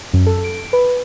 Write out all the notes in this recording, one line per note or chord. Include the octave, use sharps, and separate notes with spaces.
F#2
A4
D7
B4